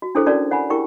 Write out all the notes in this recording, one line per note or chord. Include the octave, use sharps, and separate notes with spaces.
F#4
D4 E4 G#4 A4 C5 C#5
C#4 F#4 A4 A#4 D5 A5
C#5 F#5 G#5 B5
E4 G4 G#4 A#4 G5 C#6